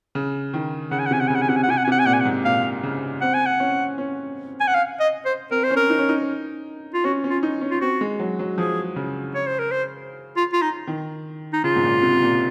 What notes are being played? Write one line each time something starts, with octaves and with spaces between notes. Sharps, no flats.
C#3
D#3
C#3 F#5
G#5
F#5
C3 G#5
F#5
C#3 G#5
F#5
G#5
C3 F#5
G#5
F#5
C3 G#5
F#5
G#5
C3
F#5
G#5
A#2 F#5
G#5
F#5
G#2
A#2 F5
C#3
C4 F#5
G#5
F#5
C#4
C#4
G#5
F#5
F5
D#5
C5
C4 A#4
C5
C#4
A#4
D#4
C#4
D#4
F4
C#4 F#4
C#4
F4
D#4
C#4
F4
C4 F#4
G#3
F#3
F#3
F3 G#4
C#3
C#5
C5
A#4
C5
F4
F4
D#4
D#3
D#4
C#3 F4
G#2
A#2
C3
A#2